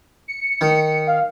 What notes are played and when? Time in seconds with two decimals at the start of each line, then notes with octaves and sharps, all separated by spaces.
0.28 C#7
0.61 D#3
1.07 F5